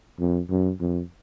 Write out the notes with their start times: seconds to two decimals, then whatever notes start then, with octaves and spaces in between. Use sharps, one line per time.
0.20 F2
0.50 F#2
0.80 F2